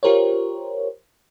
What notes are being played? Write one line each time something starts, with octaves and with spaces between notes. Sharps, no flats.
F4 G4 A#4 C5 C#5